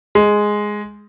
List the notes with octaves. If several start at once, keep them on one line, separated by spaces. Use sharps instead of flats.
G#3